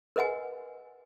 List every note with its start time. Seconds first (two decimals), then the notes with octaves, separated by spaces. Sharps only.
0.16 A#4 B4 D#5 F#5 G#5